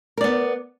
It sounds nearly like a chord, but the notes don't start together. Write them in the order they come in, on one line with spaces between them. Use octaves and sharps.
A#4 D5 B3